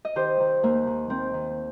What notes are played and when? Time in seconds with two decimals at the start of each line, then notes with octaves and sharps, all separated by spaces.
0.05 D#5
0.15 D#3 G4 C5
0.40 D#3
0.63 D#2 A#3
0.87 D#3
1.10 D#3 C4
1.34 D#3